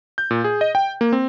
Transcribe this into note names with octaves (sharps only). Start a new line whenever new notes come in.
G6
A#2
G#4
D#5
G5
A#3
C4